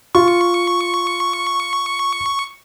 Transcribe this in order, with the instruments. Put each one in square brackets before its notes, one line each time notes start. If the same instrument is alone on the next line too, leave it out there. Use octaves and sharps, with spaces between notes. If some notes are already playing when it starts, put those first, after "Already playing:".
[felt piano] F4 [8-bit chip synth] C#6